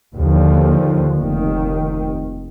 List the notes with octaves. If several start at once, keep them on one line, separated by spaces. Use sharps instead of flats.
D#2 D3 F3
F1 D#2 D#3